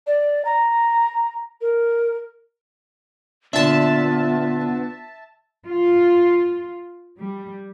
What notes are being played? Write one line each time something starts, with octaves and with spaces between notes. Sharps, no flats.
D5
A#5
A#4
A#2 D3 B3 D4 F4 E5 A5
F4
G3